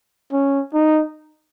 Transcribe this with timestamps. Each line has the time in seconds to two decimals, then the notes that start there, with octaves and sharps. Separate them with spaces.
0.32 C#4
0.74 D#4